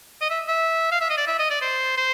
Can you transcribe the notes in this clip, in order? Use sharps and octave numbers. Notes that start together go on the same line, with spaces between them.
D#5
E5
E5
F5
E5
D#5
D5
E5
D#5
D5
C5
C5